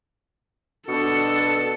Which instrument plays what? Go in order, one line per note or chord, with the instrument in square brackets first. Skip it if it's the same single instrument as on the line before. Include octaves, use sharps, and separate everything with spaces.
[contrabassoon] B2 [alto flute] D4 [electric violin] A4 [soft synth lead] C#7